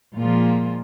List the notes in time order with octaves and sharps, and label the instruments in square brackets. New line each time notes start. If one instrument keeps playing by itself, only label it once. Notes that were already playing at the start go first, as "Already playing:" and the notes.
[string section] A#2 F3 G#3 A#3 F4